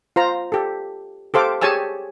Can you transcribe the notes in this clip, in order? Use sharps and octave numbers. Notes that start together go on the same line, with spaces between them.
F4 C5 A#5
G4 A4
G4 A4 C5 F5 D6
G4 G#4 C#5 G#5 A5 E6